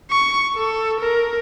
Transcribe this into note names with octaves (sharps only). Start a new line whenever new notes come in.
C#6
A4
A#4